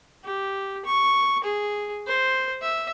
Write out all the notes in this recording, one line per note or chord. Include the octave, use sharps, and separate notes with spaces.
G4
C#6
G#4
C5
E5